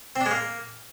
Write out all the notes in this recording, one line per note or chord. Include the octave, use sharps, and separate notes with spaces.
C4
D4
G#3
A#3